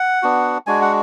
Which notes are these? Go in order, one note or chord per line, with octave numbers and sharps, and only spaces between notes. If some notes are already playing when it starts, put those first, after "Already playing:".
Already playing: F#5
B3 D4 F#4
G#3 D4 F#4 G#5
F#5